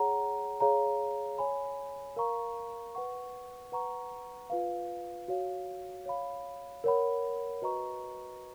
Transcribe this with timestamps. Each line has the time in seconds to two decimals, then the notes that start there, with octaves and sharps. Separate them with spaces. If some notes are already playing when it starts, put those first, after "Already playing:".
Already playing: G#4 C#5 F#5 A#5
0.60 G#4 C#5 F5 A#5
1.38 C#5 G#5 B5
2.16 A#4 F5 A#5 C#6
2.95 B4 F#5 C#6
3.72 B4 F#5 A#5 C#6
4.50 F4 B4 F5
5.28 F#4 C#5 F5
6.06 C#5 F5 B5
6.84 A#4 C#5 F#5 B5
7.62 F#4 B4 D#5 A#5 C#6